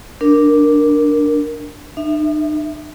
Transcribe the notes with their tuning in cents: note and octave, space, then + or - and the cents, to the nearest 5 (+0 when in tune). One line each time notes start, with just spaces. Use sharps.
D4 +0 A#4 +0
D#4 -45 E5 +0